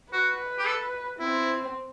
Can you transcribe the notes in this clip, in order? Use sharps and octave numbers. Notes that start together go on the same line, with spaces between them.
F#4 B4
G4
A4
C4 E4